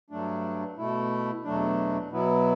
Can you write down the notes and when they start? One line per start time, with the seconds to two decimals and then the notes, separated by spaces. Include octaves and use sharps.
0.10 G2 F#3 A3 D4
0.78 B2 A3 E4
1.44 E2 B2 F#3 A3 D4
2.11 B2 F#3 B3 E4